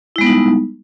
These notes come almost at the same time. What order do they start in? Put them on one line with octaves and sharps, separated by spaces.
E4 G#3 B3 G3 D#4